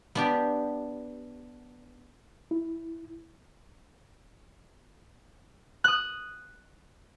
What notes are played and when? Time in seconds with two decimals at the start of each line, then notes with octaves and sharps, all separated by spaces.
0.15 B3 D4 G4
2.51 E4
5.84 D#6 F#6